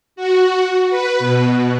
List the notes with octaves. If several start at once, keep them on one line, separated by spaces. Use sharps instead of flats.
F#4
B4
B2